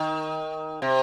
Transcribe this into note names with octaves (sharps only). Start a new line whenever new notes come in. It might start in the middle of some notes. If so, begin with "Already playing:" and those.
Already playing: D#3
C3